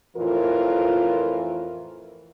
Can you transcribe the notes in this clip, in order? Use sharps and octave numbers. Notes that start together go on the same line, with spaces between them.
F2 A2 E3 F4 A#4